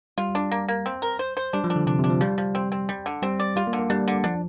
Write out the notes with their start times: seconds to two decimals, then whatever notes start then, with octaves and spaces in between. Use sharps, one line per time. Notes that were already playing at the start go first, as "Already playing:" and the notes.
0.18 G3 F4
0.35 D4
0.52 A#3
0.68 A#3
0.86 C4
1.02 A#4
1.19 C5
1.37 C5
1.53 G3 D4
1.64 F3
1.70 D4
1.76 D3
1.86 C3 D4
1.99 C3
2.04 D4
2.10 F3
2.21 F3 G3
2.38 F3
2.55 C4
2.72 C4
2.89 G3
3.06 D3
3.22 G3 C4
3.40 D5
3.56 G3 F4
3.67 A#3
3.73 D3
3.79 A#3
3.90 G3 D4
4.08 D3
4.24 F3 D4